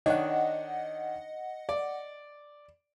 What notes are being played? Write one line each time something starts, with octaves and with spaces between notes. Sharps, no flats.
D#3 D4 C#5 D#5 F#5
D5